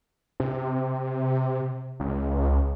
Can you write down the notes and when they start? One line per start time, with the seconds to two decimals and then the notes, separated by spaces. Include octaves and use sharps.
0.40 C3
2.00 C#2